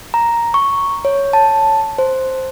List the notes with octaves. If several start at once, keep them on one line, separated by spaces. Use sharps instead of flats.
A#5
C#6
C#5
A5
C5